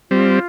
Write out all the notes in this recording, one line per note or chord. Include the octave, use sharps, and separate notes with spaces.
G3 C4 F4